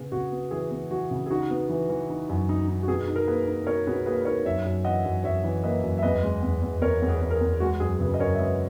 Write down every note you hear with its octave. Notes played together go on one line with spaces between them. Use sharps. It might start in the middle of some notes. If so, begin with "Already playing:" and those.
Already playing: C#3 B3 G#4
C#3 F#4
B3
E3 G#4
B3
E3 F#4
C#3
G#4
D#4 F#4
B3
E3
E3
D#4
F#2
D#4
D#4
F#4
B2 G#4
D#4
A#4
A#3 G#4 B4
D#4
B2 A#4 C#5
B2 G#4 B4
A#3 G#4 B4
B4
D#4 A#4 C#5
F#2 C#5 E5
F#2
E3 D#5 F#5
F#2
F#2 C#5 E5
E3
A#3 B4 D#5
F#2
E5
E2 B4 D#5
G#3
E2
E2
E2 A#4 C#5
E2
G#4 B4
E2
A#4
G#4
E2
G#3 F#4
F#2 G#4
C#3 G#4 B4
D#5
F#2 A#4 C#5
E5
G#3 B4 D#5